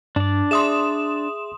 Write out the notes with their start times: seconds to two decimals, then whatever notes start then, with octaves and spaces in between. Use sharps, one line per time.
0.16 G2 D4 D5
0.51 G#4 E5 C6 D#6 E7